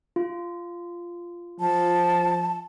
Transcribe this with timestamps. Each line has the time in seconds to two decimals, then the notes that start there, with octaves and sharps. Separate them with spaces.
0.16 F4
1.60 F3 A5